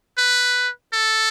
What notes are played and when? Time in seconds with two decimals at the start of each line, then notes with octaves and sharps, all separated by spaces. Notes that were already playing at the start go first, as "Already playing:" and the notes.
0.18 B4
0.93 A4